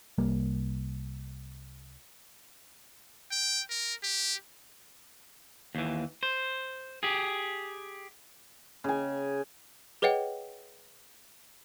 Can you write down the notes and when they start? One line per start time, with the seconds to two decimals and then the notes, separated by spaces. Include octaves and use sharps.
0.18 C2 G3 A#3
3.32 G5
3.70 A#4
4.03 G4
5.75 D#2 E3
6.23 C5
7.03 G4 G#4
8.84 C#3 G#5
10.02 G#4 B4 C#5 D#5 F#5 G5